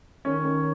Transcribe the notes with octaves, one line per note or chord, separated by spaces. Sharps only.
D#3 C#4
D#3